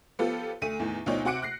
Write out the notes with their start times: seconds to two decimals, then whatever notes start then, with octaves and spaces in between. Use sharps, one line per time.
0.19 F3 B3 F4 G4 A4
0.62 D2 A3 D#7
0.79 E2 A2 D#3
1.06 D2 B2 F3 D#4 C#5 D5
1.25 C3 F#4 F#5 D6 C#7 D7
1.42 F#6 A#6 C7